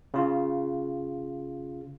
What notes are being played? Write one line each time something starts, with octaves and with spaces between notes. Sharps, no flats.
C#3 F4